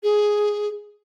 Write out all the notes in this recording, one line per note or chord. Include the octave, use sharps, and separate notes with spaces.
G#4